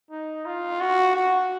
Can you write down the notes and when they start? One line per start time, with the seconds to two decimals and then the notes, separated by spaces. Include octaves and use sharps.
0.11 D#4
0.46 F4
0.81 F#4
1.16 F#4